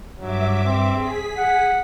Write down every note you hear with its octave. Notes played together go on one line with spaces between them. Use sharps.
G2 F#3 E5 D6
C4
G#4 B6
F#5